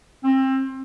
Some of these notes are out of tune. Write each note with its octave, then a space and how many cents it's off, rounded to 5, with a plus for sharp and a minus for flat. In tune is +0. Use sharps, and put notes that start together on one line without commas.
C4 +25